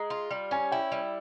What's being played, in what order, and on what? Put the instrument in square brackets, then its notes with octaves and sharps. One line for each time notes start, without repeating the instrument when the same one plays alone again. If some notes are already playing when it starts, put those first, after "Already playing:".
Already playing: [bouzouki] G#3 [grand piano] A#5
[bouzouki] F4
G3
[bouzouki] C#4 [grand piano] G#5
[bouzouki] E4 [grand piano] G5
[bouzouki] G3